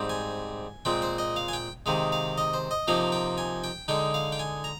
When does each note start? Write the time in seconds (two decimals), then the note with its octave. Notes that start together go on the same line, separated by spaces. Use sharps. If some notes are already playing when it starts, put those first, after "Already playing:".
Already playing: G#2 G3 C4
0.09 G#5
0.85 A#2 G#3 C4 G5
1.02 C5
1.18 D#5
1.36 F5
1.48 G#5
1.53 G5
1.86 C3 D#3 G#3 F5
2.12 F5
2.38 D#5
2.54 C5
2.71 D#5
2.88 C3 F3 A#3 D#4 F5
3.12 G5
3.38 G#5
3.64 G5
3.88 D3 G#3 D#4 G5
4.14 F5
4.32 G5
4.39 G#5
4.64 A#5